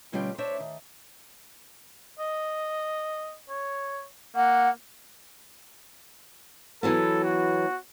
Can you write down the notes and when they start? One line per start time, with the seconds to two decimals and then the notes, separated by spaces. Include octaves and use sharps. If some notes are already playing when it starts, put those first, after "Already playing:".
0.12 B2 D3 G3 C#4 F4 G5
0.38 D4 C5 C#5 E5
0.60 D#3
2.19 D#5
3.50 C#5
4.36 A#3 F#5
6.83 E3 F#3 B3 A4
7.24 F#4